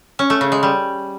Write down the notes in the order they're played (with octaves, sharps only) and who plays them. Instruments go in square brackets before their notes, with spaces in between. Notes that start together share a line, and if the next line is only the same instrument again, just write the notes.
[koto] C#4
A3
C#3
G#3
G3